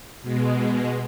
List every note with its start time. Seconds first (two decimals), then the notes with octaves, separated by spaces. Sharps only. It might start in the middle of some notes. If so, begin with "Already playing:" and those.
0.22 B2 G#3